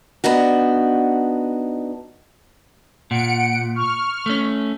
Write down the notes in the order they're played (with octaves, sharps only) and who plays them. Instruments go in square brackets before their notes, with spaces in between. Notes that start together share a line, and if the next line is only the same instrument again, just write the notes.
[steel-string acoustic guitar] B3 D4 D#4 F#4
[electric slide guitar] A#2 [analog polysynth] F#5 C#7 D7
[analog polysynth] C#6 F6
[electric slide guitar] A3 C#4